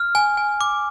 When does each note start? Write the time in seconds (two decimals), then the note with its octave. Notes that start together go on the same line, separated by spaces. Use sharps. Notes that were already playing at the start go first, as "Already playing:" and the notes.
Already playing: F6
0.15 G#5
0.37 G#5
0.61 D6